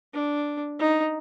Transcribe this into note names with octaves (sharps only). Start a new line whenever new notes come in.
D4
D#4